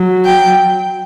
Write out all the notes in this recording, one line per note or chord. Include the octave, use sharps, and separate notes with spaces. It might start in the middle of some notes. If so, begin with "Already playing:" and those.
Already playing: F#3
G5